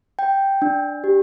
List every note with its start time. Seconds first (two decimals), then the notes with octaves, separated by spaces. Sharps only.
0.19 G5
0.62 D4
1.04 G4